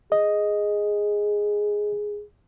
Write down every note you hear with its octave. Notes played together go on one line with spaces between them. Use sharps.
G#4 D#5